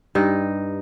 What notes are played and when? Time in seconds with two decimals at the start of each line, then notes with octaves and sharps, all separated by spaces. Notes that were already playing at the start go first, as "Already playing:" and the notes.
0.15 G2 D#4